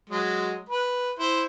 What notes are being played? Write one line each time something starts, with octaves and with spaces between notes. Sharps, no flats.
F#3 G#3
B4
E4 C5